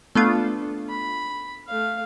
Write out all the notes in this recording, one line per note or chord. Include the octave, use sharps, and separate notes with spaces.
A3 B3 D4 F4 A4
B5
A3 F5